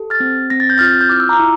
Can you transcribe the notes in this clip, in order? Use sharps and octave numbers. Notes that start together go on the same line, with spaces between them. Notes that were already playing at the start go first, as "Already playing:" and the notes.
Already playing: G4 A4
F6 A6
C4
C4 A#6
A6
G6
F4 F6 A6
G6
E4 D6 F6
E6
A#5 D6
E4